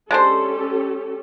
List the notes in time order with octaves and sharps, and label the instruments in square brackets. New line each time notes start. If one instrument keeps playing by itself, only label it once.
[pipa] G#3 D4 C5 [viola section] C#4 G4 A4